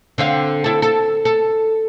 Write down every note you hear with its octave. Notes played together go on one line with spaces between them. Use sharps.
D3 C4 F5
E4 A4
A4
A4